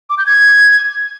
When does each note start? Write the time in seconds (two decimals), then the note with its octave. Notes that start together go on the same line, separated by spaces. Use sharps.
0.10 D6
0.18 G6
0.26 G#6